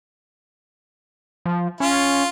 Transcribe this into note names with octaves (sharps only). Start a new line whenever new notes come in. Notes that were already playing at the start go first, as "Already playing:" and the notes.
F3
C#4 F4